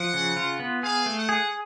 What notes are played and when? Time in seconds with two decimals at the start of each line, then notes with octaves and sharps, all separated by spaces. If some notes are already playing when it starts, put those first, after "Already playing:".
Already playing: F3 F#5
0.14 C#3
0.37 F4
0.60 B3
0.83 G#4 F5
1.06 A3
1.16 F#5
1.29 G#4